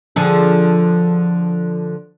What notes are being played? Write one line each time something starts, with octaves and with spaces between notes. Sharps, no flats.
D3 F3 G#4